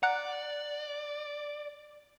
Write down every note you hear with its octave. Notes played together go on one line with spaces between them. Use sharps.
D5 F#5 A#5 F#6